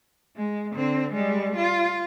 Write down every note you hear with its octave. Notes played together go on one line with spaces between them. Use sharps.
G#3
D3 C4
G3 G#3
F4